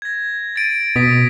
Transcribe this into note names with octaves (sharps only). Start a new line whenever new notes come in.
G#6 A#6
A6 D7 D#7
B2 D#6 A#6 B6